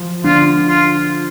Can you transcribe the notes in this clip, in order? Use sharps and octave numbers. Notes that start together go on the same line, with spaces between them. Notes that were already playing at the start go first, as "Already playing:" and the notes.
Already playing: F3
D3 F4
F4